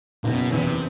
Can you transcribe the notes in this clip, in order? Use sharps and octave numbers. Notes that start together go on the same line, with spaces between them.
F#1 B2
E2 C3